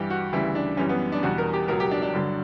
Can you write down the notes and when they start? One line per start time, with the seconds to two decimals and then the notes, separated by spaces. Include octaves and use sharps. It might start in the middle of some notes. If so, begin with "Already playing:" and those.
Already playing: G2 E3 G3 G4
0.10 F#4
0.32 D2 C#3 E3 G3 E4
0.55 D4
0.77 F#2 E3 G3 C#4
0.89 B3
1.12 D4
1.23 E2 B2 G3 F#4
1.38 A#4
1.53 G4
1.68 C#2 B2 F#3 A#4
1.80 G4
1.91 D4
2.02 D4
2.14 G2 D3 F#3